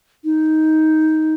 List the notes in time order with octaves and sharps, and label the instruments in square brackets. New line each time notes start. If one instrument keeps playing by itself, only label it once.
[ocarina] D#4